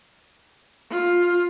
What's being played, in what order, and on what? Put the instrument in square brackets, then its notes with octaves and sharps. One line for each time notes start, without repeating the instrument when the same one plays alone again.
[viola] F4